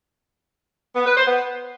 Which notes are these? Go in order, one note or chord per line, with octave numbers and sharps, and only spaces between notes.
B3
B4
C5
B3